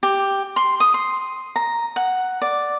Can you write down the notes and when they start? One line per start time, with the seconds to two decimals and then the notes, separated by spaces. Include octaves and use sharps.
0.03 G4
0.56 C6
0.80 D#6
0.94 C6
1.56 A#5
1.96 F#5
2.42 D5